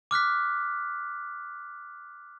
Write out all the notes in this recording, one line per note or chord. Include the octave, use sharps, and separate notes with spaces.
D6 F6 F#6 B6